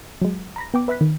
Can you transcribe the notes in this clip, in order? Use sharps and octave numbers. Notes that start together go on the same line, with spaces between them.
F#3 G#3
A#5 B5 A#6
B3 G5 D6
B4 E5 B5 F#6 B6
D#3